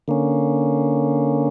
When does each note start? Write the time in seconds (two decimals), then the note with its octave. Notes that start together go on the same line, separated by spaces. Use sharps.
0.08 D3 A#3 C#4